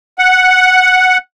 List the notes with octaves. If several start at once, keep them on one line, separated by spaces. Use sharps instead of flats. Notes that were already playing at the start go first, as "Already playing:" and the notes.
F#5